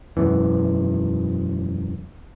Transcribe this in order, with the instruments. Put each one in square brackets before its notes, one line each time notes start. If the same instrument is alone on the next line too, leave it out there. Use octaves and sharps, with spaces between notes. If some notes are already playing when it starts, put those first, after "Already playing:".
[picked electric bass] E1 F#2 E3